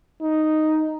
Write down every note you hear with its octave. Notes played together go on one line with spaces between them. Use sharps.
D#4